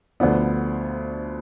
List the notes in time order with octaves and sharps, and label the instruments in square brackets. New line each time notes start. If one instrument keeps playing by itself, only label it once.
[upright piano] D2 D3 F3 B3 D4